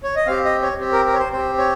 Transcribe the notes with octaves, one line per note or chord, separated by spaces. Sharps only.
C#5
D#5
C4 G4 F5
D#5
C#5
C4 G4
A#4
A#4
C#5
C5
C4 G4 C5
C#5